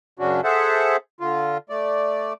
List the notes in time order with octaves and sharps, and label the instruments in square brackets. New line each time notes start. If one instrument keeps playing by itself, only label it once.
[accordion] F#2 C#3 C#4 D4 F#4
G#4 A4 C5 E5 F#5 A5
D3 F4
A3 D5